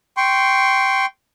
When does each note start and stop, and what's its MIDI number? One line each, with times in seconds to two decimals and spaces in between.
0.17 1.06 79
0.17 1.06 84
0.17 1.06 85